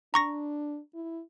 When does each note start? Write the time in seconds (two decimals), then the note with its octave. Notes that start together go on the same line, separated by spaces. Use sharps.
0.14 D4 A#5 C#6 A#6
0.94 E4